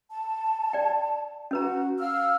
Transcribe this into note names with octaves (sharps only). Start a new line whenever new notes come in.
A5
D5 G5
C#4 F#4 B4 A#5
F5 E6 F6